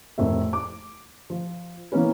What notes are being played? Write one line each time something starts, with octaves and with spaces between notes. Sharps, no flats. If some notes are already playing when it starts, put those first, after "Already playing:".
F1 F2 A2 A#4 E5
D6
F3
E3 A#3 B3 C#4 B4